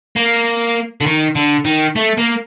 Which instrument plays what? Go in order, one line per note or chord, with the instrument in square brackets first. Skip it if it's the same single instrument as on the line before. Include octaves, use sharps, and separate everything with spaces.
[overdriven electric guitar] A#3
D3
D#3
D3
D#3
A3
A#3